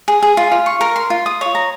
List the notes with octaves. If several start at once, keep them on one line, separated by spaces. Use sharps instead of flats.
G#4
G#4
F4
F4
C#6
A#4
C6
F4
D#6
C#5
A#5